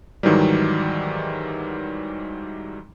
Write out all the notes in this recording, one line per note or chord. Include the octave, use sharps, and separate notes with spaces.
G#2 D#3 E3 F#3 G3